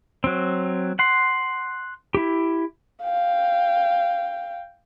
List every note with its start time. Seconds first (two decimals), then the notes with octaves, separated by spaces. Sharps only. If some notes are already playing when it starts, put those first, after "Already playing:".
0.24 F#3 C4
0.99 F#5 C6
2.15 E4 G4
3.04 F5 G5